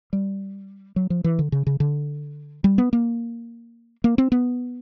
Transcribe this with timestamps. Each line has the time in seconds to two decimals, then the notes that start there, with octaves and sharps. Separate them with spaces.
0.13 G3
0.96 F#3
1.10 F3
1.24 E3
1.39 D3
1.52 C#3
1.67 C#3
1.80 D3
2.64 G3
2.78 B3
2.93 A#3
4.04 A#3
4.18 C4
4.32 B3